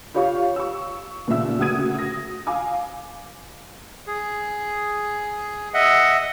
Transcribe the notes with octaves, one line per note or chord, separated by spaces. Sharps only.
F4 G4 C#5 F5 C#6
C#6 E6
D#2 A#2 C#3 E5 E6
D2 C#3 F#4 D#6 G#6 D#7
D#6 A#6
F5 G#5 D6
G#4
D#5 E5 F#5